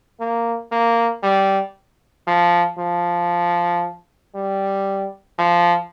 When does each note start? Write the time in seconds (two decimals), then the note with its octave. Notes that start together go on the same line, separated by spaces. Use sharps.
0.20 A#3
0.72 A#3
1.23 G3
2.27 F3
2.78 F3
4.35 G3
5.39 F3